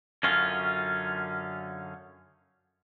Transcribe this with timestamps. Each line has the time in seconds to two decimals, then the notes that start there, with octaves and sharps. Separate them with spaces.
0.23 F#2 D3 C#4 D#4 F4